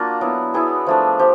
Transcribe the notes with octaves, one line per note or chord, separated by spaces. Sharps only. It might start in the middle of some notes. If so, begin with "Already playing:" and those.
Already playing: A#3 D4 F4 F#4
F#3 B3 E4
F#3 B3 E4 G#4
F3 A3 D4
F3 G4